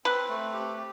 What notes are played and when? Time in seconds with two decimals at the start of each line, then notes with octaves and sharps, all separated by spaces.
0.05 C4 B4
0.29 A3
0.53 G4
0.77 G4